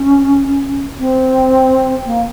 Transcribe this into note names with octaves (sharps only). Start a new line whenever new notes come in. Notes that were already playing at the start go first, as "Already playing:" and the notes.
Already playing: C#4
C4
A#3